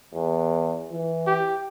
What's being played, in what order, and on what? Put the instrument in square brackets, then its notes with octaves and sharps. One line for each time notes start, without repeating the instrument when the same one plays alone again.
[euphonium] E2
E3
[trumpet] G4